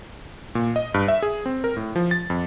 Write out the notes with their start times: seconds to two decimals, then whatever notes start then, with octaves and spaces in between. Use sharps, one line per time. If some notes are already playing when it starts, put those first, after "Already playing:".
0.55 A#2
0.76 D#5
0.94 G2
1.08 E5
1.23 G#4
1.46 C4
1.64 A#4
1.76 A2
1.96 F3
2.11 A6
2.30 F2